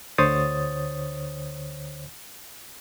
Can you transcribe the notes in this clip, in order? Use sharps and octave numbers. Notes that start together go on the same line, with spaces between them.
D2 D3 C5 C#5 D#6 A6